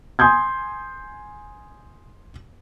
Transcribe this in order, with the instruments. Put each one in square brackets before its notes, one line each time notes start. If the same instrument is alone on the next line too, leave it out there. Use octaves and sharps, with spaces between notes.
[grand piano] G#5 C6 D#6 G6 G#6